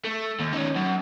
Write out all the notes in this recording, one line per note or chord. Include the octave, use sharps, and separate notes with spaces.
A3
D#2
C#4 D#4
F#2